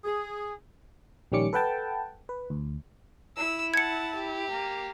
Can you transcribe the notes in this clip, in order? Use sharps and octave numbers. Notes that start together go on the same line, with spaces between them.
G#4
A#1 D#3 G3 C#4 D6 C#7
A4 B4 F#5 G5 A5
B4
D2
E4 E6
F#5 A5 G#6 C#7
G4
A#3